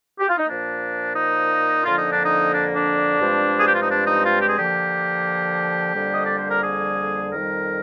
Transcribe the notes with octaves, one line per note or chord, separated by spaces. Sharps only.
G4
F4
D#4
A#2 F3 A#3 D4
D#4
F2 D3 F3 A#3 F4
D#4
D4
D#4
D4
D4
G2 F3 G#3 C4
G#4
G4
F4
D#4
D4
D#4
F4
G4
G#4
D3 F3 A#3 G4
F2 D3 G3 A#3
D#5
D5
C5
A#4
G#4
F2 D#3 G3 A#4